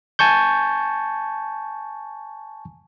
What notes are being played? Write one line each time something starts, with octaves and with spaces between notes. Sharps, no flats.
G#5 A5 C#6 G6